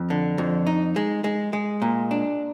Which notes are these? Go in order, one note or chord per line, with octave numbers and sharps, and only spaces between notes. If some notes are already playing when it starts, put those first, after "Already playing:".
Already playing: F2
D3
F2
D#4
G#3
G#3
G#3
A#2
D4